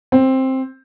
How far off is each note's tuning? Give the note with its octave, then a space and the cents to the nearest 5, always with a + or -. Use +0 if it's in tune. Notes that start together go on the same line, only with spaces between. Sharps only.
C4 +10